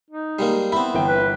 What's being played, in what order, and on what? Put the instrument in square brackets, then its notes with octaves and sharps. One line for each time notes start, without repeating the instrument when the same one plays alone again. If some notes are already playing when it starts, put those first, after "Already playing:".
[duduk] D#4
[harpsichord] G3 G#3 A#3
[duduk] B3 [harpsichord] C4 E4 [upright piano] B5
[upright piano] G1 E3 G5
[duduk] B4